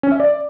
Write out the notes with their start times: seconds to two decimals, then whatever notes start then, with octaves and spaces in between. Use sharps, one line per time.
0.03 C#4
0.12 E5
0.20 D5